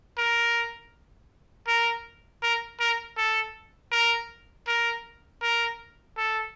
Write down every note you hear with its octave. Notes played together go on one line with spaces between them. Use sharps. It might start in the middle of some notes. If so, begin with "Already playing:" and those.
A#4
A#4
A#4
A#4
A4
A#4
A#4
A#4
A4